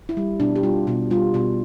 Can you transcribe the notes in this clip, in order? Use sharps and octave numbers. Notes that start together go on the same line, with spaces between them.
E4
G3
B2 D4
G4
G3 F4
B2
G3 F4
B2